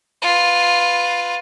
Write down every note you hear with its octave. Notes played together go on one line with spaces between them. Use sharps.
F4 B4